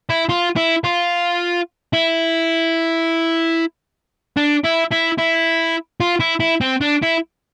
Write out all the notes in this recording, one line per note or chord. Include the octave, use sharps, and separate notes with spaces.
E4
F4
E4
F4
E4
D4
E4
E4
E4
F4
E4
E4
C4
D4
E4